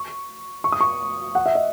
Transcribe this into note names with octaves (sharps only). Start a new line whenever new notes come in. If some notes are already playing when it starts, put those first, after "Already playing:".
Already playing: C#6
C#6
D#6
C#6
F#5
E5
D#5